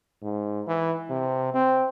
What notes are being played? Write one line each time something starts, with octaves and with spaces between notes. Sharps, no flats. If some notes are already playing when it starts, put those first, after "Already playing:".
G#2
E3
C3
C4